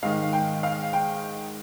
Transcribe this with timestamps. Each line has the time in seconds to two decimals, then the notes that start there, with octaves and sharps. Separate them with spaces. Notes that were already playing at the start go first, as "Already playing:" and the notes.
0.03 G#2 D#3 F5
0.33 G5
0.63 F5
0.93 G5